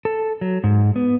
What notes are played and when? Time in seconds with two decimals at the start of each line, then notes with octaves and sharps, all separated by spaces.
0.05 A4
0.41 F#3
0.64 G#2
0.96 B3